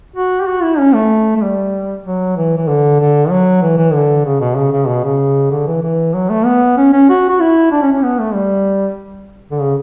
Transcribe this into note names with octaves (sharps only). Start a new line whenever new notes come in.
F#4
G4
F#4
E4
C#4
A3
A3
G3
F#3
E3
E3
D3
D3
F#3
E3
E3
D3
C#3
B2
C#3
C#3
B2
C#3
D3
E3
E3
F#3
A3
B3
C#4
C#4
F#4
F#4
E4
D4
C#4
C#4
B3
A3
G3
D3
C#3